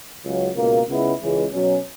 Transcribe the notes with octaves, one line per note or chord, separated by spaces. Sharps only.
C#2 C#3 F#3
C#2 B2 A#3
C#2 C#3 G#3 B3 E4
C#2 C#3 E3 G#3
B2 F#3 C#4